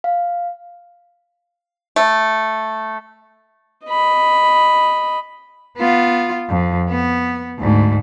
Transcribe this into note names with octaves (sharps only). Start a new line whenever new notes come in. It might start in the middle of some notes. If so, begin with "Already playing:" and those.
F5
A3
D#5 B5
B3 F4
F2
B3
D2 G#2